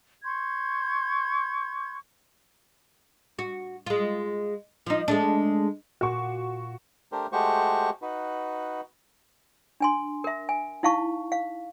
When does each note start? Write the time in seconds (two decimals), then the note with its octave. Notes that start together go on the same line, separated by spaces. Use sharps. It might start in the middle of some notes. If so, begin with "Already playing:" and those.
0.23 C6 C#6 G6 G#6
3.39 F#4
3.86 G#3 F4
4.86 F3 D#4
5.08 G#3 A3 D4
6.01 A#2 F#4 C#6
7.12 A3 D4 G4 A#4 C5
7.32 G#3 A3 F#4 G4 C5 C#6
8.02 D#4 F#4 B4
9.80 D4 G#5 C6
10.24 A#4 E5
10.49 G#5
10.83 D#4 E4 F5 A5 C#6
11.32 F5